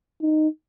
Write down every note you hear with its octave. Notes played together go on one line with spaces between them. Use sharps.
D#4